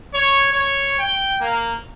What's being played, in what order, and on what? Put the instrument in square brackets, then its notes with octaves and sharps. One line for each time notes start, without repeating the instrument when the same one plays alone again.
[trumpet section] C#5
C#5
G5
A#3